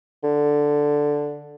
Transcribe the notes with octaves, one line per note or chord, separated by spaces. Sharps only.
D3